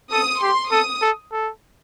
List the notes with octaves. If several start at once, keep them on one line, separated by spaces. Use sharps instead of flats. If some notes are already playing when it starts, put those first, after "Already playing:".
A4 D#6
G4 C6
A4 D#6
A4
A4